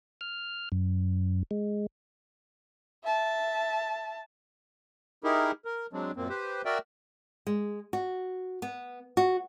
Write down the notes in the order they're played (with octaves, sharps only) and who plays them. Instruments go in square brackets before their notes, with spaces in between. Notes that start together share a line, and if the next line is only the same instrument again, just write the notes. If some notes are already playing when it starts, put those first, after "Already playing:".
[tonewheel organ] F6
F#2
G#3
[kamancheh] E5 A5
[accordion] D#4 E4 G4 G#4 A#4
A#4
F#3 G#3 C4 D4
F#2 A#2 A#3 C4
G4 B4 C5
F#4 A#4 D5 E5 G5
[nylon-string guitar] G#3
F#4
B3
F#4